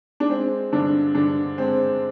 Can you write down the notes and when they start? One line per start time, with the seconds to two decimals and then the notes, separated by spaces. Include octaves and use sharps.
0.20 D4
0.30 G#3 C4
0.72 G2 D3 D4
1.15 G2 D3 D4
1.58 G#3 C4